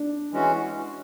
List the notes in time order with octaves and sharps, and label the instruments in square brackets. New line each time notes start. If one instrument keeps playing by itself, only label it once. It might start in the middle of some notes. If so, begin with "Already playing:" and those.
Already playing: [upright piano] D4
[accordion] E3 G#3 C#4 F#4